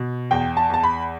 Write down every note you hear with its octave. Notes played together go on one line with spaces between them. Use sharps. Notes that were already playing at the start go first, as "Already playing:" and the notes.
Already playing: B2
E2 G5
A5
E2 A5
B5